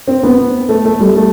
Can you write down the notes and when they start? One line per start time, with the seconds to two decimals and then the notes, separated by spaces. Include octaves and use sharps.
0.07 C4
0.23 B3
0.69 A3
0.85 A3
1.00 G3
1.16 A3